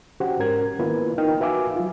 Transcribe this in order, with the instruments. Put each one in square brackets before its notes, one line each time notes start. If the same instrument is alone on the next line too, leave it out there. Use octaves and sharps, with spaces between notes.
[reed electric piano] C#4 F#4 G4 C5 F#5
G#2 C#4 A#4 G#6
D#3 A#3 B3 E4 F4 B4
D#4 A#4 G5 F6
F#4 B4 E5 F5 G#5 D6
F#3 F4